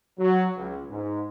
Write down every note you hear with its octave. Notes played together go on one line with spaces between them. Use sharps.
F#3
C#2
G#2